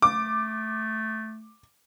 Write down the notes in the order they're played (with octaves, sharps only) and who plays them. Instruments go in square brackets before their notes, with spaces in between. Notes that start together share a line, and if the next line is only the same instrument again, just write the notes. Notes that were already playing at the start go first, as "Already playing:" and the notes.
[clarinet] A3 [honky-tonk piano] D6